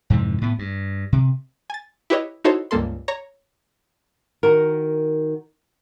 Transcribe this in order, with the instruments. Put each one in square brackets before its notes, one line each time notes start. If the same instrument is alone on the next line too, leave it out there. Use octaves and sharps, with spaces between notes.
[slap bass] F2 G#2 C3 E3
A2 B3
G2
C3
[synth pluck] G#5 A6
E4 G4 B4 C#5 D#5
D#4 E4 F#4 A4 C5 C#5
C#2 G2 A#3 A4 C6
C#5 A#5 A#6
[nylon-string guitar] D#3 F#4 A#4